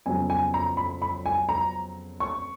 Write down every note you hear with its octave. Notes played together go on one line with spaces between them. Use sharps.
F2 C#3 F#3 B3 G#5
G#5
A#5
B5
B5
G#5
A#5
C#6